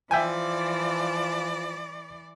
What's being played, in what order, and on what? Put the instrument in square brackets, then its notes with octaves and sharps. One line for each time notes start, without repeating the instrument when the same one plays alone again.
[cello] E3 D5 [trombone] F3 [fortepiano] E5 G5 G#5